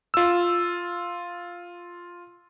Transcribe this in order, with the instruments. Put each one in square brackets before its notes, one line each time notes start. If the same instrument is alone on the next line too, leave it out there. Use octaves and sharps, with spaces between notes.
[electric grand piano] F4 E6